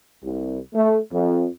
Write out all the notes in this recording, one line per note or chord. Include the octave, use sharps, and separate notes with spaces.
C2
A3
F2